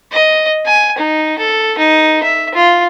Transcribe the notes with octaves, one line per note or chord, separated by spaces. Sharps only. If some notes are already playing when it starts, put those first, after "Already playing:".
D#5
G#5
D#4
A4
D#4
E5
F4